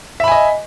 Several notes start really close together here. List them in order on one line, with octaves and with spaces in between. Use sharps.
E5 B5 G#5 D#5